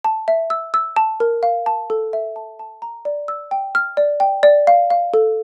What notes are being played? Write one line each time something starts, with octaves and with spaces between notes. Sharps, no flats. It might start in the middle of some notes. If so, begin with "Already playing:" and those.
A5
E5
E6
E6
A5
A#4
F5
A5
A4
E5
A5
A5
A#5
D5
E6
G5
F6
D5
G5
D5
F5
F5
A4